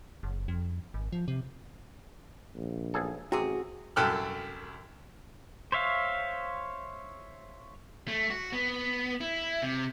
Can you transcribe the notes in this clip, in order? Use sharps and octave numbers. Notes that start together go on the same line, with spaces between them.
F#1
F2
G#1
F3
C3
A#1
B1 G#4 A4
A1 C3 F#4 G#4
C2 F#2 A4 G5 F6 F#6
C5 C#5 E5 F5
A3
F#4
B3
E4
C3